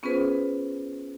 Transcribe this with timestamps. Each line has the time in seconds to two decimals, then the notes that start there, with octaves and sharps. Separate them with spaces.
0.03 B3 C#4 F4 G#4 B4 C5